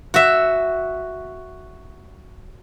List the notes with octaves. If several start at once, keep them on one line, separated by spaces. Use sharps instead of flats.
F#4 E5